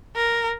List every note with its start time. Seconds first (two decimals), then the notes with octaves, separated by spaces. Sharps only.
0.16 A#4